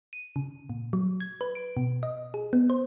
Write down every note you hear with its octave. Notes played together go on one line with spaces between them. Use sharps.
D#7
C#3
A#2
F#3
G#6
B4
D7
B2
D#5
G#4
B3
C5